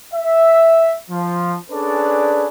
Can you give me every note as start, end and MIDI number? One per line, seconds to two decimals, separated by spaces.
0.13 0.94 76
1.10 1.55 53
1.70 2.48 61
1.70 2.48 62
1.70 2.48 68
1.70 2.48 69
1.70 2.48 71
1.70 2.48 74